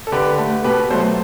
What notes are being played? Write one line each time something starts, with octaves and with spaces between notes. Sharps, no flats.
A4
D3 G4 B4
A3
B2 G4 B4
F#3 A3 A4 C5